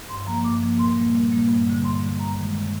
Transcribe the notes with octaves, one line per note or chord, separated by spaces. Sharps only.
G2 C6
F3 A#3 A#5
G2 D6
F3 A#3
A#2 C6
G3 A#3
A#2
G3 A#3
G2
D3 G3
G2 C6
D3 G3
G2 A#5
D#3 G#3
G2